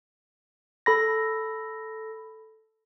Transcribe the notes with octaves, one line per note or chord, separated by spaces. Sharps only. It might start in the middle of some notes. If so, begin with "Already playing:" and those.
A4 B5 A#6